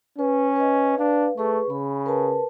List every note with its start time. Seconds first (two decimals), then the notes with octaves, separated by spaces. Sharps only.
0.19 C#4 B4
0.56 B4 D#5
0.98 D4 B4 F5
1.38 A3 G#4 B4 C#6
1.70 C#3 B5
2.06 A#4 B4 A5